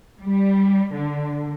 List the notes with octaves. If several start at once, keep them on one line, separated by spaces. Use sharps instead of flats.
G3
D3